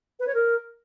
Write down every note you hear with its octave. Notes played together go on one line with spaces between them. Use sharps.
B4
C#5
A#4